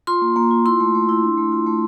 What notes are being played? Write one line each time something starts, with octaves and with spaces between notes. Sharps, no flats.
F4 C6
A#3
A#3
F4
E4 C6
A3
A3
E4
D4
A3
F4
A3